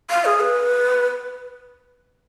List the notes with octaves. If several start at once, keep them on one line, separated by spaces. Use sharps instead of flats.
F5
G#4
B4